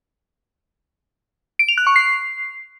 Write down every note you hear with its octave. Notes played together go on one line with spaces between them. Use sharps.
D7
F7
F#6
C#6
C7